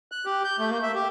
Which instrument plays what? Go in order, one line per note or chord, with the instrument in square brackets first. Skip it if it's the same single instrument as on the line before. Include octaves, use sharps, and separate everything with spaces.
[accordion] F#6
G4
G6
A3
A#3
E5
G4